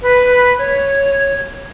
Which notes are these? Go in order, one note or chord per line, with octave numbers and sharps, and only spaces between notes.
B4
C#5